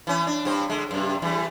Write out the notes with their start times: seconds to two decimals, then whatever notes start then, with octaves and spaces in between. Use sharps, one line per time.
0.07 E3 C#4
0.27 D4
0.45 G2 C4 C5
0.70 D3 G#3
0.91 F#2 C3
1.22 E2 E3 G3